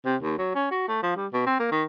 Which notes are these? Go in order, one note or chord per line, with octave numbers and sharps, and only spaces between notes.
C3
D#2
F#3
C#4
F#4
A3
F3
G3
B2
C4
A#3
D#3